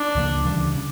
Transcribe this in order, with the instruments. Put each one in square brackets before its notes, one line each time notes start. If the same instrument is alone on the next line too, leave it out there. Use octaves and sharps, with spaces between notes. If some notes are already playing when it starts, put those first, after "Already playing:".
Already playing: [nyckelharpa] D4
[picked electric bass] C#2 C#3 F3 A#3
D2 C#3 E3 G3
C#3